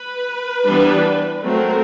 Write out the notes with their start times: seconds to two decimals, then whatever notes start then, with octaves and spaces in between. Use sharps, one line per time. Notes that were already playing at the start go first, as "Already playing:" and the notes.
Already playing: B4
0.65 E3 G3 B3 D4
1.45 F#3 A3 C4 A#4